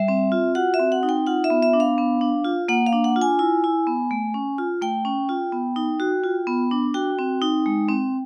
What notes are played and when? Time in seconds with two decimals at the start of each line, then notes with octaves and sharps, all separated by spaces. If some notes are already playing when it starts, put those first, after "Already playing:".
Already playing: G3 E5
0.08 C4
0.32 F4
0.55 F#4 F#5
0.74 E5
0.80 C4
0.92 F#5
1.03 D#4
1.09 G5
1.27 F4 F#5
1.44 E5
1.50 B3
1.62 E5
1.73 D4
1.80 F5
1.98 B3
2.21 D4
2.44 F4
2.68 A#3 F#5
2.86 F5
2.93 D4
3.04 F#5
3.16 F4
3.22 G#5
3.39 E4
3.64 E4
3.87 B3
4.11 A3
4.34 C#4
4.58 F4
4.81 A3 G5
5.05 C#4
5.29 F4
5.52 B3
5.76 D#4
6.00 F#4
6.24 F4
6.47 B3
6.71 D4
6.94 F#4 G5
7.19 C4
7.42 D#4
7.66 G#3
7.89 C4